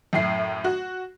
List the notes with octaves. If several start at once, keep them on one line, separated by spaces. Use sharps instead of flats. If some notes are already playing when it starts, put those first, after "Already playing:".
F#2 A2 E4 C7
F#4